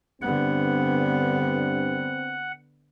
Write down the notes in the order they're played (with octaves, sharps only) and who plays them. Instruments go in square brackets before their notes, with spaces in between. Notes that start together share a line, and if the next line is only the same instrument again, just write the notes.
[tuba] G2 [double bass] D3 B3 [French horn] C4 [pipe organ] F#5